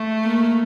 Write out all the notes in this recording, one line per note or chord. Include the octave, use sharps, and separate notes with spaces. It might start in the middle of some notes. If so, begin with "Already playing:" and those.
Already playing: A3
A#3